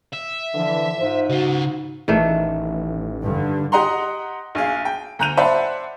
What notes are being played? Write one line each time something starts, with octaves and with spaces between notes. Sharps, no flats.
E5
D3 E3 F3
G#2 D#4 F4 C5
C#3 F4 F#4
A1 D#3 E3 A3 D4
G2 D3
G4 D#5 F#5 A#5 C6
A#1 G#4 F5
G5
D2 A#5 F#6 G6 D#7 F7
C5 D5 E5 F#5 A5 B5